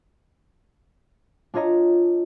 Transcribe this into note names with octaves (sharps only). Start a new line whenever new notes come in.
D4 F4 C#5 D#5 A#5